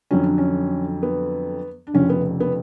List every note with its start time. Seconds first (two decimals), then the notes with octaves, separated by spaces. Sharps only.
0.11 F2 D3 F#3 C#4
0.24 D4
0.38 C#4
1.03 B3
1.87 D4
1.94 F1 F2 C#3 F3 C#4
2.10 B3
2.40 B3